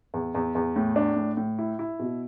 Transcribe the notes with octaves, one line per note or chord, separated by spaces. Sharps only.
E2
E2
E2
A2
D4
A2
A2
E4
E4
B2